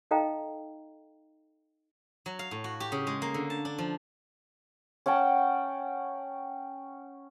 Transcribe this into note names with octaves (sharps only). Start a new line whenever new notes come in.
D#4 A4 D#5 F5 G5 A#5
F#3
F5
A2
F#4
G4
C#3
G#3
A#3
D3
A5
D4
F3
C#4 F#5 G5 A5